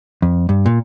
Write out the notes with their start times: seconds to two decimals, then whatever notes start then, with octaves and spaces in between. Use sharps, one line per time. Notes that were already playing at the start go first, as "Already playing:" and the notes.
0.22 F2
0.49 G2
0.66 A#2